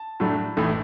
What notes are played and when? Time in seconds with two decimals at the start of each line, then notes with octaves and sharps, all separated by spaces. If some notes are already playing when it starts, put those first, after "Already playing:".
Already playing: A5
0.20 A2 F#3 A3 D4
0.57 A1 A2 A3